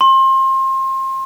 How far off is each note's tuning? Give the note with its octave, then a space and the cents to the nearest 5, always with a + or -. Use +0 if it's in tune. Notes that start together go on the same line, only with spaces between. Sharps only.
C6 +30